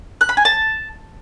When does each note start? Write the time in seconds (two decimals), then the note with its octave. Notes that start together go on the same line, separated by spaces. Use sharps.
0.21 F#6
0.29 B5
0.37 G#5
0.45 A5